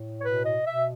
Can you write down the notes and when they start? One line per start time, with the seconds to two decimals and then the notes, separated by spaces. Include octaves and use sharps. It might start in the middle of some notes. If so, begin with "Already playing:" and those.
Already playing: A2
0.20 C#5
0.24 B2 B4
0.44 D#5
0.65 B2 E5